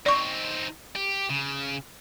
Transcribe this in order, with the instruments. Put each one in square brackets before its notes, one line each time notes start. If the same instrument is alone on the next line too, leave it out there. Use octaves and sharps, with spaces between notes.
[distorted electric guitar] C4 D#4 [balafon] D5 C#6
[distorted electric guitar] G4
C#3